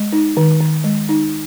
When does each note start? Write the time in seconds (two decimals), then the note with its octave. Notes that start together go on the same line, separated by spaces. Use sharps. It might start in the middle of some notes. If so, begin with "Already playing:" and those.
Already playing: G#3
0.12 D#4
0.37 D#3
0.61 D#3
0.84 G#3
1.09 D#4